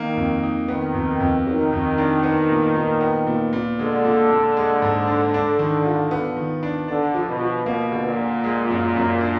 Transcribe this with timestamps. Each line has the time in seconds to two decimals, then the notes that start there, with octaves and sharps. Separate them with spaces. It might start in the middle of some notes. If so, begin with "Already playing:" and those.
Already playing: D#3 A#3
0.17 F2
0.43 D#4
0.68 D#3 B3
0.94 F2
1.20 F2
1.46 D#3 F#3
1.73 F2
1.98 D4
2.23 B3
2.50 A#2
2.76 A#2
3.01 B3
3.27 A#2
3.53 A#2
3.78 D3 G#3
4.05 A#2
4.31 A#2
4.57 G#3
4.82 G#2
5.07 D4
5.34 D4
5.59 D#3
5.85 F4
6.11 B3
6.37 D#3
6.63 D4
6.88 D3 D4
7.14 F3
7.28 B2
7.41 F3
7.66 B2 A#3
7.92 D3
8.05 A#2
8.18 D3
8.44 G#3
8.70 F#2
8.96 F#2
9.21 D4